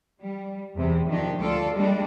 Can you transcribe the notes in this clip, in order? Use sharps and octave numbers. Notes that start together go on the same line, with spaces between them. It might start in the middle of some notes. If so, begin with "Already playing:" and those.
G3
E2 C3
D#3 F3 D4 G4
D2 F4 A4 D5
G3 G#3 A#3 D4